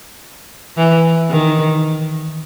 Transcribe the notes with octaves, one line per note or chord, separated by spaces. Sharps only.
E3
D#3